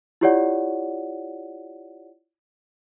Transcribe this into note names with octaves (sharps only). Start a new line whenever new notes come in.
E4 F4 G4 C#5 D5 F#5